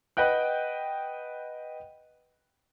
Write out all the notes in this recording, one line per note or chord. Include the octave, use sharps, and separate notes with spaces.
B4 D#5 F#5 G5 F#6